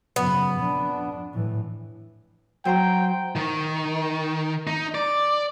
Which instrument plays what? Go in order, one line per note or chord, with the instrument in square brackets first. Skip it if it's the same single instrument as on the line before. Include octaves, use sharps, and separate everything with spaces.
[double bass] F#2 C#3 [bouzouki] B3
[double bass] F2 D4
A2 E3
[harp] F#3 C5 A#5 [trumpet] G5
[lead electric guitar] D#3
D#4
D5